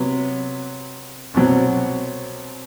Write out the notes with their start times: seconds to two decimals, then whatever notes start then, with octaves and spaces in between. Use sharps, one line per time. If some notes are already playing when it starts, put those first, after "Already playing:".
Already playing: C3 F#3 B3
1.34 C2 B2 F#3 C4